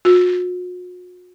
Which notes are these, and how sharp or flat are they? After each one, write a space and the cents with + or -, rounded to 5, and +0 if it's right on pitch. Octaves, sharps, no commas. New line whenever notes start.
F#4 -45